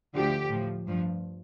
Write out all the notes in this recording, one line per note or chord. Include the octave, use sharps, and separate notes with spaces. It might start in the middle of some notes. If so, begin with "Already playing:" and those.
D2 D3 F3 G4
A2 F3
G2 F3